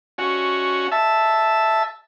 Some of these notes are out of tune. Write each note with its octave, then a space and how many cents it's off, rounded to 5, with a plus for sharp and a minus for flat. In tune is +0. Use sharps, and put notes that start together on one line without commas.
C#4 +5 F#4 +0
E5 +0 A5 +0